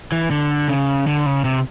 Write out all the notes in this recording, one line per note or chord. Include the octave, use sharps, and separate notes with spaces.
E3
D3
C#3
D3
C#3
C3